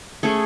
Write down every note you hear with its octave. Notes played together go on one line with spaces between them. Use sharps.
A3 C#4 G#4